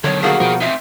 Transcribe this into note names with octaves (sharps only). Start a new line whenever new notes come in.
B2 D3 D#3 F#3 C#5
G3 A#3 F#4 G#4
B2 F3 A#4 G5
C4 D#4 E5